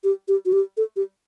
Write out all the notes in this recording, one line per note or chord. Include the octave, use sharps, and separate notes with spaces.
G4
G4
F#4
G4
A4
G4